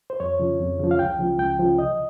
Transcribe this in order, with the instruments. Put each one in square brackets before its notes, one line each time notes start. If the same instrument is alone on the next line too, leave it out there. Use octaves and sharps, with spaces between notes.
[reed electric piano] C5
F2 C#5
C#3 F3
F2
C#3 F3
F5
C#2 G5
C#3 F3
C#2 G5
C#3 F3
C2 D#5